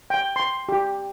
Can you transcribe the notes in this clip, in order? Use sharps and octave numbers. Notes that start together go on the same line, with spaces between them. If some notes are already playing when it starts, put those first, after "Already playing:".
G5
C6
G4